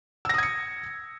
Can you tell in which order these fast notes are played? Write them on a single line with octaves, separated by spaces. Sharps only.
E6 A#6 D#6 G#6 C#7